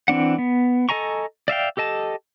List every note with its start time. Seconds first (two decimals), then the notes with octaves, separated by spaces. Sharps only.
0.08 E3 C4 D4 F#5
0.38 B3
0.89 A4 D#5 G#5 A#5 C#6
1.48 D5 E5 F5 G5
1.77 G4 A4 D#5 A5